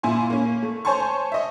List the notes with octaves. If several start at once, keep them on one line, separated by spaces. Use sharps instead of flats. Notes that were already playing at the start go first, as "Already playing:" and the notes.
A#2 E4 G#5 C6
A#3 C#4
A3
C5 C#5 G#5 A5 C6 C#6
D#5 E5